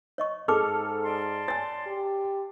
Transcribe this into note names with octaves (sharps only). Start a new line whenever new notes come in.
C#5 D#5 C#6
G#2 G#4 A4 D6 F6
D5 A5 C6
C#5 G#5 A6
G4